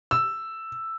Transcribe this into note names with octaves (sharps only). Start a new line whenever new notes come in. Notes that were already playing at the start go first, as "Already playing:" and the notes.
E6